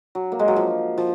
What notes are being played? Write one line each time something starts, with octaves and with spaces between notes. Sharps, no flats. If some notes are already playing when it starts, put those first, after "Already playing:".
F#3
A#3
G#3
F#3
F3
F3